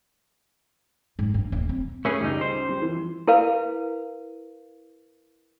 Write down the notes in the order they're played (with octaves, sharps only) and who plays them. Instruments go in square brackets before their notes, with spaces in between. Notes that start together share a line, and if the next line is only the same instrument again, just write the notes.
[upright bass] G#2
G2
D#1
C4
[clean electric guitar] A3 C#4 G#4 [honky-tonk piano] B4
[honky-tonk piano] C#2 [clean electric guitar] G3 D#4
[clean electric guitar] C5
[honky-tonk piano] G3
E3 F3
[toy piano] E4 A#4 B4 F5